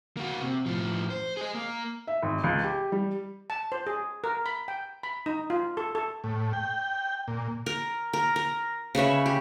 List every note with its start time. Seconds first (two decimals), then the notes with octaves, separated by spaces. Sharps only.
0.17 A#3 F#4
0.42 C3
0.66 A2 F3
1.10 C5
1.37 G#4 D#5
1.55 A#3
2.07 E5
2.23 G#1
2.44 C#2
2.64 G4
2.92 G3
3.50 A5
3.72 C5
3.87 G#4
4.24 A#4
4.46 B5
4.68 G5
5.03 B5
5.26 D#4
5.50 F4
5.77 A4
5.95 A4
6.24 A2
6.53 G5
7.28 A#2
7.66 A#4
8.13 A#4
8.36 A#4
8.95 C#3 B4 C#5 E5
9.26 G4